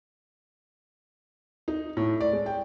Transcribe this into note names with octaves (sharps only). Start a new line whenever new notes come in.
D#4
A2
D5
G#3
G5